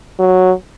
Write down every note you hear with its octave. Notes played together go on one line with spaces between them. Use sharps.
F#3